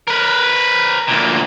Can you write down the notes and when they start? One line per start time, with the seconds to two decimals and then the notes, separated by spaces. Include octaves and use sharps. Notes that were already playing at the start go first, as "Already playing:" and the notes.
0.08 A#4 B4
1.08 D2 A#2